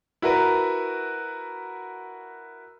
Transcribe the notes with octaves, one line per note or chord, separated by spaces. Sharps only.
E4 F#4 A#4 B4